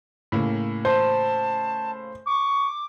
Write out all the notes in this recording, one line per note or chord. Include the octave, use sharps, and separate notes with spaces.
A2 C#3 A#3
C5 A5
C#6 D6